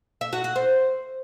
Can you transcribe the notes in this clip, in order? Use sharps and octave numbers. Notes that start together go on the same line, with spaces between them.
E5
F#4
F#4
C5